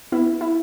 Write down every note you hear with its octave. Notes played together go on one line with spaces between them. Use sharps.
B3 E4
E4